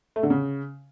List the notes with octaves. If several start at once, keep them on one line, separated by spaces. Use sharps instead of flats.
A3
D3
C#3